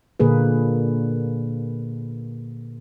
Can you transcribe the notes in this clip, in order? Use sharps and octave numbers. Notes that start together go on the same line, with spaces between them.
A#2 D3 A#3 G#4 B4